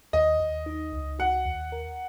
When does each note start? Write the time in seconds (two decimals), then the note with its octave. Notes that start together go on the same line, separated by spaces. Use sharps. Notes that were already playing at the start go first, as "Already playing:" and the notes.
0.13 D#2 D#5
0.40 D#2
0.66 D#4
0.93 C#2
1.19 F#4 F#5
1.46 D#2
1.72 A#4